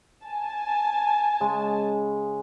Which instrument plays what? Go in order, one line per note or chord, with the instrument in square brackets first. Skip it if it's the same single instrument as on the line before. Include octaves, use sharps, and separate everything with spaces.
[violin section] G#5 A5
[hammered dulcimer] C#3 G#3